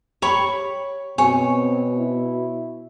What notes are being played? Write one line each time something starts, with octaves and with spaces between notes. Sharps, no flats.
G4 C#5 B5 C#6
B2 C4 C#5 G#5
E4